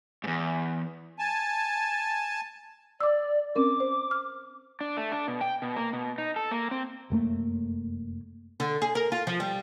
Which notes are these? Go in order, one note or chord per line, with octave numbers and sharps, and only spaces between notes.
E2 G#2
G#5 A5
D5 D6 E6
C4 C#4 A#4 D6
C5
F6
D4
A3
D4
B2
G5
B2
A#3
B2
D#4
A4
A#3
C4
F1 F#2 A3 A#3
D3
G#4
A#4
F4
F3
G3